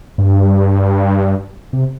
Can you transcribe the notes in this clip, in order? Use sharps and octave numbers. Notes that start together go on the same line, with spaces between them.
G2
C3